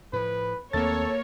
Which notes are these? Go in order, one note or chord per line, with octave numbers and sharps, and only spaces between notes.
A2 F3 B4
D#2 A3 A#3 C4 A4 C#5 A6